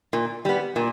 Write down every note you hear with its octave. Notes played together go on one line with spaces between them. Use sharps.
A#2
G3 B3
A#2